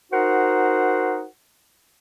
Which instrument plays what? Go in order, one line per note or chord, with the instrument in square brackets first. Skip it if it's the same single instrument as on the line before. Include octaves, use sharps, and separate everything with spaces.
[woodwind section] D#4 F#4 A#4 C5 F#5